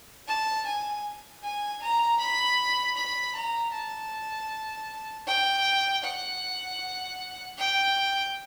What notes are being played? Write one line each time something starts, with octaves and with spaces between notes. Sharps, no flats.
A5
G#5
G#5
A#5
B5
B5
A#5
A5
G5
F#5
G5